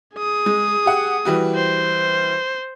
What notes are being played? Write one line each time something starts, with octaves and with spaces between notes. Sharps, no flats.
G#4 D#6
G#3
G4 F#5
E3 G3 F#4
C5